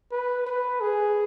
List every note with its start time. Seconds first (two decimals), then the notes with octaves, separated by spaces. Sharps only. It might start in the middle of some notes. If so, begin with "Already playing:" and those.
0.11 B4
0.46 B4
0.81 G#4